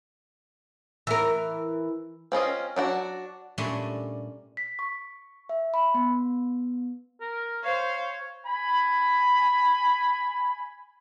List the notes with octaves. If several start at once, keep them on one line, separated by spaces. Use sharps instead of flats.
E3 A#4
C4 C#4 F4 D#5
F#3 D4 F#4
A#2 G3 A3 C#4 D4
B6
C#6
E5
B5
B3
A#4
C5 C#5 F5
G#5 B5